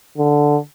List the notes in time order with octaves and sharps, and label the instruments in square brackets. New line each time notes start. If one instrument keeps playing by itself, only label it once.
[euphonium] D3